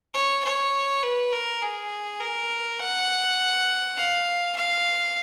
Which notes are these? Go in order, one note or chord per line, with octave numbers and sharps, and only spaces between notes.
C#5
C#5
B4
A#4
G#4
A#4
F#5
F5
F5